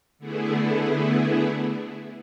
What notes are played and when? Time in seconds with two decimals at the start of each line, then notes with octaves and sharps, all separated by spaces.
0.19 D3 A3 B3 E4 G#4